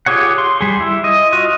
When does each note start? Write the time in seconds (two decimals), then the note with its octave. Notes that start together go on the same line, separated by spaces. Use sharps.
0.06 F4 G4 G#4 C#5 F#5
0.38 C6
0.61 G3 G#4
0.80 E4
1.04 D#5
1.32 F4 F#4 D#5